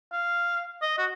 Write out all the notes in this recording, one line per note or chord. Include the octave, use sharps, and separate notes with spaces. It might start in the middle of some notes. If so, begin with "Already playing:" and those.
F5
D#5
F#4